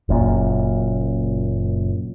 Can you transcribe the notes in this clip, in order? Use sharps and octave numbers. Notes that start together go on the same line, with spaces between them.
F#1 F#2 A#2